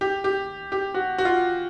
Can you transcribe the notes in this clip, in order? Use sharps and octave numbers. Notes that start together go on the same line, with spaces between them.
G4
G4
G4
F#4
F#4
F4